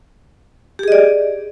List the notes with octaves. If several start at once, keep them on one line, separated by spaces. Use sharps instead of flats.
G4 G#4 D5 D#5